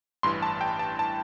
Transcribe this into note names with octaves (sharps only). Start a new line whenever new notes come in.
A1 G2 E3 C6
A5
G5
A5
A5